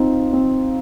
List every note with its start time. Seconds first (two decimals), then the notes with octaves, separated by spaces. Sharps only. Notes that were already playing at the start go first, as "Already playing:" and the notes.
Already playing: C4 D#4 F4
0.33 C4